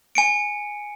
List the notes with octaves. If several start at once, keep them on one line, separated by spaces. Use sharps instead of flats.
G#5 C#7 D7